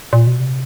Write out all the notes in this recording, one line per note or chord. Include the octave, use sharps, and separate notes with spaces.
A#2
B2
C3